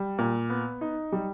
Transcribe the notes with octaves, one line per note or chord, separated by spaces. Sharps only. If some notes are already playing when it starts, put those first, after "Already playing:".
Already playing: G3
A#2
B3
D#4
G3